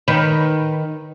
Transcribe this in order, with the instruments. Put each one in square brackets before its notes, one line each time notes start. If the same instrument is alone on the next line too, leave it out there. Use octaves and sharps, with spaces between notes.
[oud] D#3 B4